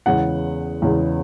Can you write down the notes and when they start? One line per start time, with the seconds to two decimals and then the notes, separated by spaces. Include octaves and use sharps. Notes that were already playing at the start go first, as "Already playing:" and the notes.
0.06 E2 C#3 G#3 F#5
0.82 E2 C#3 G#3